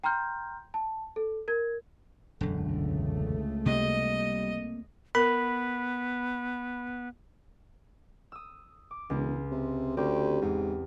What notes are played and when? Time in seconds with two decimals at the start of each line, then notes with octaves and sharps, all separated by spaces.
0.04 G5 A#5 C6 F6 G6
0.74 A5
1.16 A4
1.48 A#4 G#6
2.41 E1 C#2 F#2 D3 A3
3.66 C3 G3 A#3 D#5
5.15 B3 A#4 B5
8.32 D#6 E6
8.91 D6
9.10 E1 C#2
9.51 C3
9.97 D2 C4 C#4 G4
10.42 E2 G#2